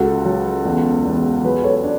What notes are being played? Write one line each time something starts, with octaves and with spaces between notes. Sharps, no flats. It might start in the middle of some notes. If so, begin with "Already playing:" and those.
Already playing: C#2 F#4 A4
F#3
E2
E2
F#3 G#4 B4
A4 C#5
D4